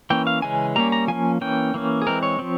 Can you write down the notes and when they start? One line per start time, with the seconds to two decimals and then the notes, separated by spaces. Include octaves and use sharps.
0.10 E3 A#3 C#4 G5
0.27 F5
0.42 C#3 E3 G#3 C#4 G#5
0.76 G3 A#3 C#4 A#5
0.92 A#5
1.08 F3 A#3 C#4 G#5
1.41 E3 A#3 C#4 G5
1.74 E3 A#3 C#4
2.02 G#4
2.07 E3 G#3 C4 A#4
2.23 C#5
2.39 F3 C4